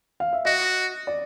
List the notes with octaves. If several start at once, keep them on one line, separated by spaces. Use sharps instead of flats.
F5
E5
F#4 D#5
D5